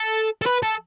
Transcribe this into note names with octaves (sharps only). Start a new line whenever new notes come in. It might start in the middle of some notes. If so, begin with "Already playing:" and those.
Already playing: A4
A4
B4
A4